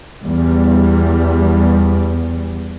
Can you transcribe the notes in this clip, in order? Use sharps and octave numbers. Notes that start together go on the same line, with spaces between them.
E2 G3